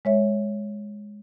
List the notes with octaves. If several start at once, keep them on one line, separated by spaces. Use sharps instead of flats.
G#3 C#5 E5